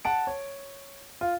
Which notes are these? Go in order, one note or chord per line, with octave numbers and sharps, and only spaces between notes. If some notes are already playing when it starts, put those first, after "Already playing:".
F#5 A5 D7
C#5
F4